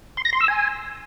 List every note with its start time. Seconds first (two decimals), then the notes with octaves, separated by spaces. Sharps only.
0.17 C6
0.25 A#6
0.33 C6
0.40 E6
0.48 G#5